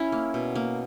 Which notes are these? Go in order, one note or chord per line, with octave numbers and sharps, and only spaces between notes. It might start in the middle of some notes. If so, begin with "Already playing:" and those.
Already playing: C#4 E4
A#3
B2
A#3